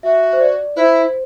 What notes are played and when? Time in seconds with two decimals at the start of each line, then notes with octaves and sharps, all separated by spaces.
0.03 F#4 E5
0.33 C5
0.40 D5
0.76 E4 C5